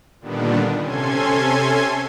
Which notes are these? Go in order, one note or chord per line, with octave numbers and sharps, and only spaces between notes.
A#2 D3 D#3 G3 B3 D4
C3 C#4 A4 G#5 C6 G#6